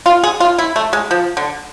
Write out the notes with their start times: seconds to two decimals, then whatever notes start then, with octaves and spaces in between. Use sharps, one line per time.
0.06 F4
0.24 G#4
0.40 F4
0.58 E4
0.76 A3
0.93 G#3
1.11 F3
1.37 D3